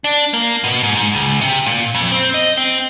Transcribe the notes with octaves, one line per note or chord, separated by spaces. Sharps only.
D4
A#3
B2
G#2
G#2
C#2
C3
A#2
F2
C4
D#5
C4